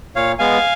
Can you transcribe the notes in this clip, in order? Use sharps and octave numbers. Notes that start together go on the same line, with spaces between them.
A#2 C#5 F5
G#3 B3 F5 G#5